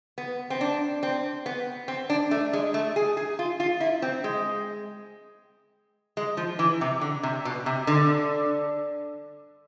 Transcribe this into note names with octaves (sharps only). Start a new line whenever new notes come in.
B3
C4
D4
C4
B3
C4
D4
A3
G#3
A3
G#4
G#4
F4
F4
E4
C4
G#3
G#3
F3
E3
C3
D3
C3
B2
C3
D3